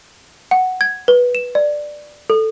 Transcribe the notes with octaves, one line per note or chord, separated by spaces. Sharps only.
F#5
G#6
B4
E7
D5
A4